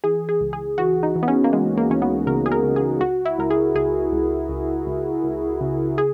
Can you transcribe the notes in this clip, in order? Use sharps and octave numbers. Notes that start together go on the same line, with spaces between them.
E3 G#4
G#4
C#2
G#4
E3 F#4
D#4
E3
B3
C#4
A#3
E3 G#3
A#3
E3 C#4
B3
C#3 A#4
G#4
A#4
C#3
G#4
C#2 F#4
E4
C#2 A#4
G#4
C#2 G#4
C#2
C#2
C#2
C#2
C#3
G#4